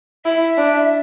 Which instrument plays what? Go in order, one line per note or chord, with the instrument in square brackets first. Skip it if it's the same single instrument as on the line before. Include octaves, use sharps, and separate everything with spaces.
[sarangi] E4 [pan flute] E5
[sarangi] D4